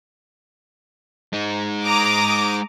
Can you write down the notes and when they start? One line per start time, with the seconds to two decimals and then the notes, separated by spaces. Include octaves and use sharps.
1.33 G#3 D#4
1.86 A#5 D6 D#6